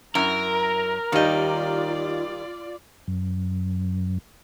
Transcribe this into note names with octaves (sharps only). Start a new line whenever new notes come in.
F#2 E4 A#4 A#5
D#2 D#3 G3 F4 D5 D#5
F#2